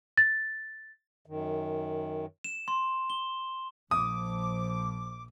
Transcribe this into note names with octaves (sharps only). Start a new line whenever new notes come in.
A6
F#2 D#3
E7
C6
G7
A#1 F3 D6 D#6